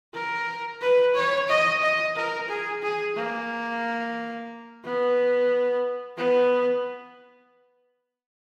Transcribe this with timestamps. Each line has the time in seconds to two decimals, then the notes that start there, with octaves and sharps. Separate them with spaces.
0.14 A#4
0.81 B4
1.15 C#5
1.48 D#5
1.82 D#5
2.16 A#4
2.48 G#4
2.82 G#4
3.16 A#3
4.84 B3
6.18 B3